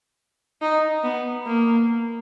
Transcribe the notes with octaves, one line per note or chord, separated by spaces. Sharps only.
D#4
B3
A#3